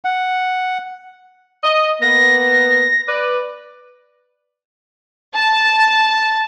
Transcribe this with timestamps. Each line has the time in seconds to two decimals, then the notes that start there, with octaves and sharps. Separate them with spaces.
0.05 F#5
1.64 D#5
2.02 A#3 B3 A#6
3.08 B4 D5
5.34 A5